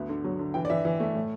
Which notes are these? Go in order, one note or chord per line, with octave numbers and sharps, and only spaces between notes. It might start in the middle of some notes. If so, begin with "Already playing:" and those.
Already playing: D2 B3
D3
F#3
D3
E3 G5
D5
E3 E5
E3
A3
A2